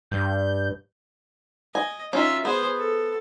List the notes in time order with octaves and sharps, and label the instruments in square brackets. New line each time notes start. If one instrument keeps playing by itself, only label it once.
[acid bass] G2 [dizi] G6
[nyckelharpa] D#5 [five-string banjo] G#5
[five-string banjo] C#4 D#4 [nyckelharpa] F4 E5
[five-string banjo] B3 [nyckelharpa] G#4 C5
[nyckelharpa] A4